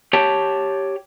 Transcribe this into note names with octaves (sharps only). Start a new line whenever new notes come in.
G4 C#5 G5 A5